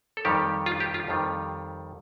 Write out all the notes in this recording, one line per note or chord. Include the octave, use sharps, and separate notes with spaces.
A4
F2 D#3 G3 G4
F4
G4
F4
F2 D#3 G3